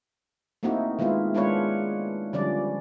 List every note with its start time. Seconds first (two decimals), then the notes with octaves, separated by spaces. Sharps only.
0.63 A3 A#3 C4 D#4 E4 F#4
0.99 D#3 G#3 B3 E4 F4
1.34 G#3 B3 D4 F4 B4 C#5
2.33 D3 F3 G3 C#4 D5